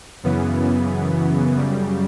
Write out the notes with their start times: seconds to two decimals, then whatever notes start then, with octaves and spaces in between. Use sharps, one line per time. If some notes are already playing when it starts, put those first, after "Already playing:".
0.23 F#2 C#3 E3 B3
1.56 F#2 C#3 G3